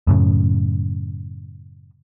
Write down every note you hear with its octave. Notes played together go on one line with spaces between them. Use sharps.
F#2 A2 C#3